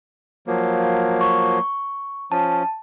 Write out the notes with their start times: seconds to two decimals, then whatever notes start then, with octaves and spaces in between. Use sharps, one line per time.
0.47 F3 F#3 A#3
1.21 C#6
2.32 F3 C#4 A5